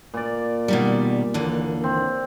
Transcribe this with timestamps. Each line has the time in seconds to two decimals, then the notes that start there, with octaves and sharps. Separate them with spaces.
0.14 A#2 D5
0.68 B2 D#3 G3
1.34 D#2 D3 E3
1.84 C4